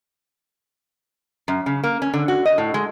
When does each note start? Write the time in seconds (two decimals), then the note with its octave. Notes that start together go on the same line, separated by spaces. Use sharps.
1.48 F#2
1.66 C#3
1.84 A#3
2.02 C#4
2.14 D3
2.28 F#4
2.46 D#5
2.58 A2
2.74 G#3